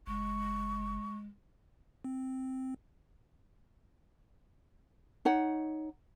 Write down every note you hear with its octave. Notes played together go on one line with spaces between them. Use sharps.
F#1 G#3 C#6
C4
D#4 C#5 F#5